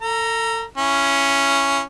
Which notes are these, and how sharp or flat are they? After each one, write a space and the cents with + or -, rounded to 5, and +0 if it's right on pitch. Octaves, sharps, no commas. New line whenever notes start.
A4 +35 A#5 +0
C#4 +0 E4 +25